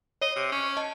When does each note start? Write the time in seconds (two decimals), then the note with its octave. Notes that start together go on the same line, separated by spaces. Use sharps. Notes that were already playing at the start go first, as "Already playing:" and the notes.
0.21 C#5 D#5
0.36 C3
0.52 C#4
0.77 D#5 A5